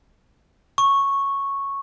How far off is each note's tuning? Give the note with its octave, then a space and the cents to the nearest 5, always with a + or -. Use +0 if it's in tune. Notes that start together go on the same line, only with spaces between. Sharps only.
C#6 -5